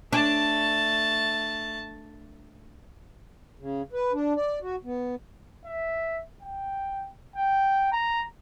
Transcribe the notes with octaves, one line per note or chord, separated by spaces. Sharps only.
A3 D4 A5
C#3
B4
D4
D5
F#4
B3
E5
G5
G5
A#5